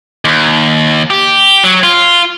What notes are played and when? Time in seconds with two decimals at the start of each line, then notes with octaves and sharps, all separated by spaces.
0.25 D#2
1.10 G4
1.63 F#3
1.83 F4